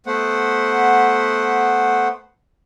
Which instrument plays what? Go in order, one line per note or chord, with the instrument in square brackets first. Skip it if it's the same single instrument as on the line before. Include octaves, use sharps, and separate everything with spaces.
[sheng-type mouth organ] A3 B3 C5 F#5